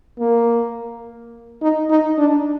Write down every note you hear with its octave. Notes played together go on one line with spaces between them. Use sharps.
A#3
D#4
D#4
D4